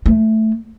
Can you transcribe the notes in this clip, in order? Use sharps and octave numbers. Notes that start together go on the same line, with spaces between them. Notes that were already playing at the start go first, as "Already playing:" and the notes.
A3